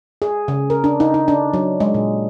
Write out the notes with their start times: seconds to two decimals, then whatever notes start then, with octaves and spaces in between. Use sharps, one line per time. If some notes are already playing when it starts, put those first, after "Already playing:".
0.22 G#4
0.48 C#3
0.70 A#4
0.84 D4
1.00 D#4
1.14 D#4
1.28 D4
1.54 F#3
1.80 G#3
1.94 A#2